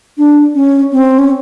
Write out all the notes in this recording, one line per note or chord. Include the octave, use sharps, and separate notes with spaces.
D4
C#4
C4
C#4